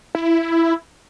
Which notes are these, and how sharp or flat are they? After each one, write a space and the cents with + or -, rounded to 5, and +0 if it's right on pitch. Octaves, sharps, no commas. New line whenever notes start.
E4 +10